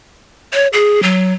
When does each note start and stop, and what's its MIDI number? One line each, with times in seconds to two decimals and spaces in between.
0.53 0.67 73
0.73 1.03 68
1.03 1.33 54